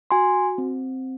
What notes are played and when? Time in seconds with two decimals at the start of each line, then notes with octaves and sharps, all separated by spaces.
0.11 F#4 G#5 C6
0.58 C4